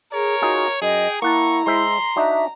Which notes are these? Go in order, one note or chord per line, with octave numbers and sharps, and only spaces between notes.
G#4 A#4 C#5
D#4 F4 F#4 G#4
F#2 G#4 D#5 G5
A#3 E4 F#5 A5 A#5 C#6
G#3 C5 E5 C6
D4 D#4 F#4 E5